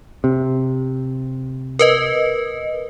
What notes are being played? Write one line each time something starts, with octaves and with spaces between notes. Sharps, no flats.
C3
A#4 B4 D#5